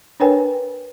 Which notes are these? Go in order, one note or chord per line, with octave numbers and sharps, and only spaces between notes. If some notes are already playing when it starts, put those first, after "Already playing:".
D4 A#4 B4 C#5 G5 G#5